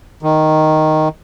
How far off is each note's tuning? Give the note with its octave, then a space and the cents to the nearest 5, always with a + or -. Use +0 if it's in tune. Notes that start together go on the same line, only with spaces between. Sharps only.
D#3 +0